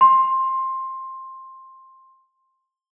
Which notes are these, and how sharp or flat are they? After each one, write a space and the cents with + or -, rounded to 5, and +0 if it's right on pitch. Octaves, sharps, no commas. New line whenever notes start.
C6 +15